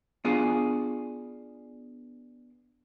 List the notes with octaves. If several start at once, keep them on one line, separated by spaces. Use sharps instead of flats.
B3 D4 F4 G#4